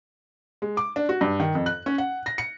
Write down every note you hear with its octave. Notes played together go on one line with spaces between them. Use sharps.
G#3
D6
D4
F#4
G2
D#3
F2
F#6
C#4
F#5
A#6
C#7